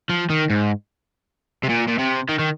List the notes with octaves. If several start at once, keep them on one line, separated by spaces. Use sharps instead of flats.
F3
D#3
G#2
C3
A#2
A#2
C3
D#3
D#3